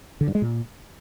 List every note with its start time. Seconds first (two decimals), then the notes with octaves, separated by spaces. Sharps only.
0.21 D3
0.28 G2
0.35 G#3
0.42 A#2